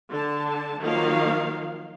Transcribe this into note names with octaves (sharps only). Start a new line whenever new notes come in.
D3 A5
D#3 F3 F#3 A#3 F5